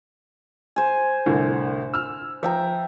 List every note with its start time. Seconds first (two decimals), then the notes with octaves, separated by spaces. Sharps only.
0.76 C5 G#5
1.26 C2 A2 D3
1.94 E6 F6
2.43 F3 E5 G5 A#5